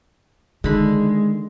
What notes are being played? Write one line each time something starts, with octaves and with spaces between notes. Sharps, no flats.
D3 D#3 G#3 B5